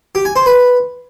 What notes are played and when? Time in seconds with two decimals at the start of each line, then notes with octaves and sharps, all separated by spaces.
0.15 G4
0.25 G#5
0.36 C5
0.46 B4